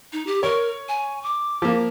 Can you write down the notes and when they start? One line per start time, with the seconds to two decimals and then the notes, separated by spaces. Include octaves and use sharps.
0.12 D#4
0.27 G4
0.43 A#4 C#5
0.88 G#5
1.23 D6
1.62 F3 A#3